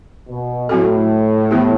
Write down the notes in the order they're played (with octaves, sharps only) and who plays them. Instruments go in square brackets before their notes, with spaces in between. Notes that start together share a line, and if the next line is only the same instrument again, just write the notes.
[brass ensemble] B2
[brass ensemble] A2 [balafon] F#3 C4 F#4 A4
[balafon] E3 B3 E4 G4